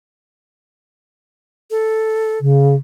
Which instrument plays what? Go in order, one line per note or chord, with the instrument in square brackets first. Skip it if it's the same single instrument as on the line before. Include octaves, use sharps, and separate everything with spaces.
[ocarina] A4
[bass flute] C#3